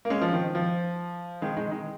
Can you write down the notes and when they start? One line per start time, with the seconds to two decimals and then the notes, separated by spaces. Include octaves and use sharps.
0.05 A#3
0.10 G#3 C#4
0.21 F3
0.33 D#3
0.55 F3
1.42 D#3 G#3
1.57 D#3 G#3
1.71 D#3 G#3